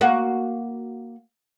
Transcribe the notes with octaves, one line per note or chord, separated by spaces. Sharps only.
A#3 F#4